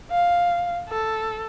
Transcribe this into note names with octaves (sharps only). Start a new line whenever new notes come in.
F5
A4